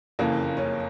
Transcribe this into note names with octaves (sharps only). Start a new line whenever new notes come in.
F#1 F2 C#3 E3 A#3
C#4